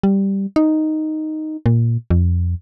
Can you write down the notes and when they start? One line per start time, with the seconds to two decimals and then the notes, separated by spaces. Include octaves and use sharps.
0.03 G3
0.56 D#4
1.66 A#2
2.10 F2